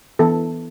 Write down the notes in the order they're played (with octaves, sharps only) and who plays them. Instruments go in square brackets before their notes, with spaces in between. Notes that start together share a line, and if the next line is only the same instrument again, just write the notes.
[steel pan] E3 B3 A4